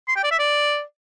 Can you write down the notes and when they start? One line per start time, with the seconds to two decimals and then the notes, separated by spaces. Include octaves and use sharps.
0.08 C6
0.16 G5
0.24 D5
0.31 E5
0.39 D5